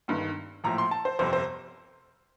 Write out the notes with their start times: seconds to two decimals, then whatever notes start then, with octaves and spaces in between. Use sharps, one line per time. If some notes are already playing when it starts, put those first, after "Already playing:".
0.08 G1 G2 D#3
0.64 A#1 A2 F3 A#5
0.78 C6
0.91 A5
1.05 C5
1.19 G1 F2 C3 C5
1.33 C5